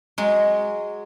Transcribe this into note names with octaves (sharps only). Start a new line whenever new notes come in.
F#3 G#3